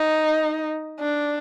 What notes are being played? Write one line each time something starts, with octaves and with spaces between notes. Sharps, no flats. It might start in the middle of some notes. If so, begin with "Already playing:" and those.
Already playing: D#4
D4